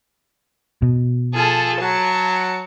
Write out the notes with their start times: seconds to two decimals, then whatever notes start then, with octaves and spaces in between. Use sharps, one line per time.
0.82 B2
1.35 F3 G#4 A4 A5
1.80 F#3 A5 C#7